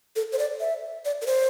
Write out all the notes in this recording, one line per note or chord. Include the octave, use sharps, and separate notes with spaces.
A4
C5
D5
E5
D5
A#4
C5